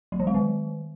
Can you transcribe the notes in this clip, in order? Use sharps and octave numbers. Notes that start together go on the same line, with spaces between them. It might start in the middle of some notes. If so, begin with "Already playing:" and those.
F#3
E3
G#3
D#3